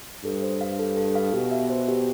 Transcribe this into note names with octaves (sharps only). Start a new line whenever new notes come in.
G2 A4
C5
F5
A4
A4
F5
B2 G4
E5
C5
G4